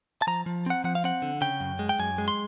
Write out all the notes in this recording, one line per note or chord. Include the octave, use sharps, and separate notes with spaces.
A5
F3 A#5
F3
C4 F#5
F3 F#5
F5
C4 F#5
D3
C#3 G5
F#2
G#3
G5
F#2 G#5
G#3
C6